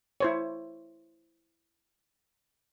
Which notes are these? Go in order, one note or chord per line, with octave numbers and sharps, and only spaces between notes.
E4 C5 C#5